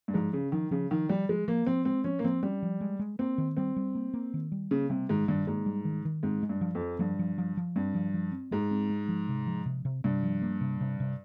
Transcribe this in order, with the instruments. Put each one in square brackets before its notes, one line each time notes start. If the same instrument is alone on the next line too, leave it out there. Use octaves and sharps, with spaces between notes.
[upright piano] G2
[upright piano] G#2 [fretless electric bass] F3
[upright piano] C#3 [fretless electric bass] C#4
[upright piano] D#3 [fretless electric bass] F3
[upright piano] C#3 [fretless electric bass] F3
[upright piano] D#3 [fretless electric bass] F3
[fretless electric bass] F3 [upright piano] G3
[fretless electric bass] F3 [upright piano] G#3
[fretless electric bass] F3 [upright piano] A#3
[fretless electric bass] F3 [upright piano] C4
[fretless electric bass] G#3 [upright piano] C4
[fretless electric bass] F3 [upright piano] C#4
[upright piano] A#3
[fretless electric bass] F3 [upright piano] C4
[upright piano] G3 [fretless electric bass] C#4
[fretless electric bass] F3
G#3
G#3
[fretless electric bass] A#3 [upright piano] C4
[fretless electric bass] D#3
[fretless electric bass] G3 [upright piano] C4
[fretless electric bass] G3
A#3
A#3
D#3
G3
[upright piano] C#3 [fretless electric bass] A#3
[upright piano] C3 [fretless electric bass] G3
[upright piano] G#2 [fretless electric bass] D#3
[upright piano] G2 [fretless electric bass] D#3
[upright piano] G#2 [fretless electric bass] A#3
[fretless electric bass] G3
D#3
D#3
[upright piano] G#2 [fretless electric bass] C4
[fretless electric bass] G#3
[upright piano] G2
[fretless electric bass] F3
[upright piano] F2
[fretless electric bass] C4
[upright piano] G2 [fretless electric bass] F3
[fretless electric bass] F3
F3
F3
[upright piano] G2 [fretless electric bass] C4
[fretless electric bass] F3
F3
C4
[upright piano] G#2 [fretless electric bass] G#3
[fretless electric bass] C4
G#3
F3
C3
F3
C3
C3
[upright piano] G2 [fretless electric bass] C3
[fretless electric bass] F3
A#3
C3
C3
C3